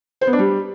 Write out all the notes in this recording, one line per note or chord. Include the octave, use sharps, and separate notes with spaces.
C5
B3
D4
G3